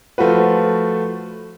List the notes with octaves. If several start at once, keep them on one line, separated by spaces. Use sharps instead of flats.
F3 A3 F4 F#4 B4